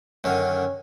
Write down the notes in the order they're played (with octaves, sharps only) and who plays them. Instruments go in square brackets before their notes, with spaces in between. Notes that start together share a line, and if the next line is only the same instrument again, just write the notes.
[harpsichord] F#2 D3 D#3 [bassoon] C#4